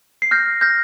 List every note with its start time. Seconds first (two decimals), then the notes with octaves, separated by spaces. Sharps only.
0.22 C7
0.31 F6 G6 A#6
0.61 F6 G6 A#6